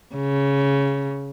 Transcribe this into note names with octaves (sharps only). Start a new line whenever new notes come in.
C#3